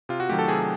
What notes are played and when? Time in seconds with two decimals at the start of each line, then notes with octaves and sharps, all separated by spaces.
0.09 C3 F4
0.20 F#4
0.29 D#3 F#3 A3 G4
0.39 A4
0.48 C3 G#4